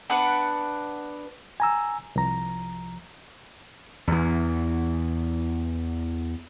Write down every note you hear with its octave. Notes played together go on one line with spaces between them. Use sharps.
B3 D4 B4 F#5
G#5 A#5 E6
C2 F3 A#5
E2 E3